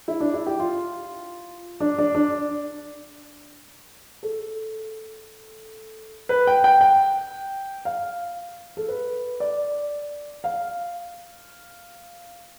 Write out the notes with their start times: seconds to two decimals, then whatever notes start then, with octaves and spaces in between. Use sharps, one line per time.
0.08 E4
0.20 D4
0.34 E4
0.46 G4
0.60 F4
1.80 D4
1.98 D4
2.15 D4
4.23 A4
6.29 B4
6.47 G5
6.64 G5
6.81 G5
7.85 F5
8.77 A4
8.88 B4
9.40 D5
10.44 F5